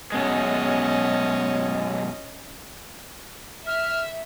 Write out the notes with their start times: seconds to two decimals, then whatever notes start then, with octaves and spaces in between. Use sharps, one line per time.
0.12 F#2 B2 G#3 C#4 D#5
3.67 E5 F6